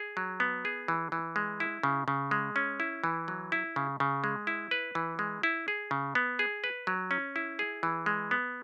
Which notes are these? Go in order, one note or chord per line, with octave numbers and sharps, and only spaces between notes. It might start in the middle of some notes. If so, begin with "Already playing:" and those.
Already playing: G#4
F#3
B3
G#4
E3
E3
G#3
E4
C#3
C#3
G#3
C#4
E4
E3
F#3
E4
C#3
C#3
G#3
E4
B4
E3
G#3
E4
G#4
C#3
B3
G#4
B4
F#3
C#4
E4
G#4
E3
G#3
B3